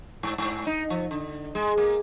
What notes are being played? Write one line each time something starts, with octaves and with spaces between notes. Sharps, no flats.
G#2
G#2
D#4
F3
D3
G#3
A#3